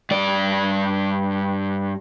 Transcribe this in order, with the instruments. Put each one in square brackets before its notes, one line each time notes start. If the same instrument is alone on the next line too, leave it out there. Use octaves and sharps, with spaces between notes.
[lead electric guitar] G2 D5